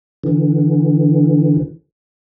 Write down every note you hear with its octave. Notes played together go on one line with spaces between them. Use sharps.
D3 E3